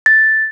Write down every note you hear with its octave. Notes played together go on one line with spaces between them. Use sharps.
A6